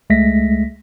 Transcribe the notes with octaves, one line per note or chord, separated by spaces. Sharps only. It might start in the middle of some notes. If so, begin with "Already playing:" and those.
C#2 G#3 A3 E5 A#6 B6